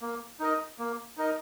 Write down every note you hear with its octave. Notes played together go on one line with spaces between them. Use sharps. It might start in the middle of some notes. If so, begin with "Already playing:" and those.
A#3
D#4 A#4 D#5
A#3
D#4 A#4 D#5